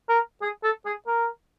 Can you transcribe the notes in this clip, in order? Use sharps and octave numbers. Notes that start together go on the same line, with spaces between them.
A#4
G#4
A4
G#4
A#4